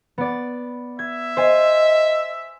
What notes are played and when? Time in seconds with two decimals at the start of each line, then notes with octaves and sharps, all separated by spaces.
0.18 B3 D5
0.99 E5 G#6
1.37 C5 D#5 G#5